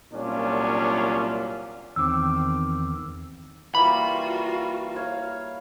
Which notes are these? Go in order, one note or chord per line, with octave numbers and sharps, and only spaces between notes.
C2 A#2 F#3 C#4 D4 F4
E2 D#3 C4 D6 E6
E3 G3 A#3 F4 F#4 B5
C#5 F5